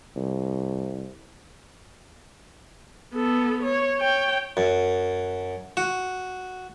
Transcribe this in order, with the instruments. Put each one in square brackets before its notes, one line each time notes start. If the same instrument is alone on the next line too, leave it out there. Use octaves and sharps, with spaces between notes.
[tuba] C2
[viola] B3 A4
C#5
C#5 G5
[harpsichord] F#2
F#4